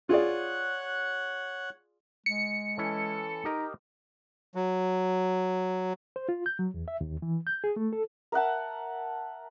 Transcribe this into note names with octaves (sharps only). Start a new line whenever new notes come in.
F4 G#4 C#5 D5 F#5 F#6
G#3 C#7
E3 C#4 E4 A4
D#4 G4 A#4 D#5
F#3
C5
F4
G6
F#3
E2
E5
D#2
E3
G6
G#4
A3
A4
A#4 E5 F#5 A5